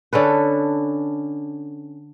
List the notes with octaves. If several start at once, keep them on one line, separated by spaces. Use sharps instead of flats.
D3 C#4 A4 B4